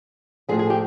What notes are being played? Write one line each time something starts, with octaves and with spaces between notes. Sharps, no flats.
A2 F3 G#4
G#4
G4